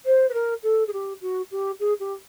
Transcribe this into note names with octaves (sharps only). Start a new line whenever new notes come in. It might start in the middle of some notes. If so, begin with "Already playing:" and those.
C5
B4
A#4
A4
G#4
G4
F#4
G4
G#4
G4